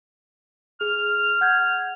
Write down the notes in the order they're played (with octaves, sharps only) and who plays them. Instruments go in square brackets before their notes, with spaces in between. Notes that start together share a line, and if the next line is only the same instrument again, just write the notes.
[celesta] G#4 [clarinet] F6
[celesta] F#5 G6 G#6